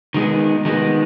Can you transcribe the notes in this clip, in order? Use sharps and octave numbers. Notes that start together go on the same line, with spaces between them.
D#3 G#3 B3
D#3 G#3 B3